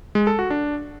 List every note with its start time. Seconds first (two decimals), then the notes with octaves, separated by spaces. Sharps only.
0.15 G#3
0.27 A4
0.39 F#4
0.50 D4